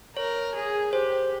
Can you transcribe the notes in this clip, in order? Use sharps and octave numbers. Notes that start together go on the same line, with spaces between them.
A#4 C#5
G#4
G4 C5